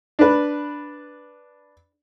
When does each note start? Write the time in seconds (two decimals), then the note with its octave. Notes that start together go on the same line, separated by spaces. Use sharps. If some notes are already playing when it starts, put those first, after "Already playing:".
0.19 D4 B4